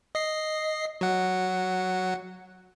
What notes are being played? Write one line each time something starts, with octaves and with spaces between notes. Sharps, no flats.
D#5 C7
F#3 F#5